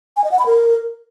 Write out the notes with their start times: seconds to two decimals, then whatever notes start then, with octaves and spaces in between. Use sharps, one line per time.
0.17 G#5
0.24 D#5
0.32 F#5
0.39 B5
0.46 A#4